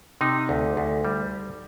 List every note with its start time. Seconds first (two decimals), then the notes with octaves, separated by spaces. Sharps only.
0.21 C3 D#4
0.49 D2
0.77 D2
1.05 G3